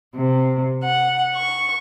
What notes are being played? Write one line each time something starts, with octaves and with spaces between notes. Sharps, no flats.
C3
F#5
C#6